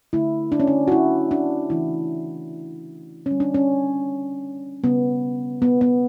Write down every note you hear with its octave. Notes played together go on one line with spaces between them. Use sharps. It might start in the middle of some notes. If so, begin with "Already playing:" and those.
D3 A3 E4
D4
C#4
D4
F#4
E4
D4
C#3 E3 A3 E4
D3 G3 C#4
D4
C#4
C#3 G3 B3
B3
B3